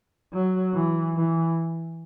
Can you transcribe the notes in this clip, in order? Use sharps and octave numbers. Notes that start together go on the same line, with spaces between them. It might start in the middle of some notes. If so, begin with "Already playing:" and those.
F#3
E3
E3